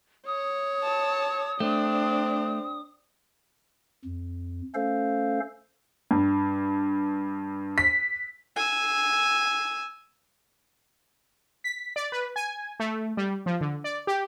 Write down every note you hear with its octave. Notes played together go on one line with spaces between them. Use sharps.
C#5 D#6
A5
A3 C4 D4
F2
A3 C#4 A4 C5 F5
G2
B6
G#5 E6
B6
D5
B4
G#5
A3
G3
F3
D3
D5
G4